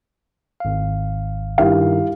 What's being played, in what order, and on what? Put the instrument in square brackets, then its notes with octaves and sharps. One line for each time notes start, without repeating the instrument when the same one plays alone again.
[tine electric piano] G#1 F5
[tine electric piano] G2 D#3 [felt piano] E4 G4 F5